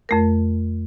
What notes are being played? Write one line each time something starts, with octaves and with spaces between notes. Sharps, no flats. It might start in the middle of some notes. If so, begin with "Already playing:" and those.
F2 A3 A#4